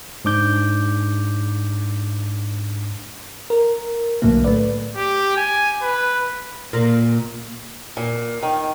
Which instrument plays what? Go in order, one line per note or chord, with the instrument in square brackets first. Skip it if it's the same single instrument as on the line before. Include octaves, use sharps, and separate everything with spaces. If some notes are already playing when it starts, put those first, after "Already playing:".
[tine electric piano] G#2 D4 D6 G6
[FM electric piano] A#4
B1 A2 D3 F#3 A#3
A3 B4 D5
[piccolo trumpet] G4
G#5
B4
[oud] A#2
[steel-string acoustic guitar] A#2
D#3